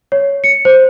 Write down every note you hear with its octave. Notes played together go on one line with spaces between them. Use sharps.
C#5
C#7
C5